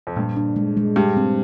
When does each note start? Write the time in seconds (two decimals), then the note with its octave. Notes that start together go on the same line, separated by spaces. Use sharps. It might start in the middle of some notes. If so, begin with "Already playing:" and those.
0.07 F2
0.16 G2 A#2
0.37 D4
0.56 G#3
0.77 G#3
0.96 G2 G4
1.17 C4